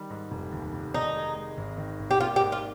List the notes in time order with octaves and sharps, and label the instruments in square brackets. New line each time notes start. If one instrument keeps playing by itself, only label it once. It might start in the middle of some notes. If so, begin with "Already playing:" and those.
Already playing: [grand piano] D#3 G3
G#2
F1
D#2
F1
[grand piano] D#3 [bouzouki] D#4
[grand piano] G#3
G#3
G#1
D#3
G#1
[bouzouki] G4
[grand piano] A#3 [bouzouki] F4
[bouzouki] G4
[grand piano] G#2
[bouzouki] F4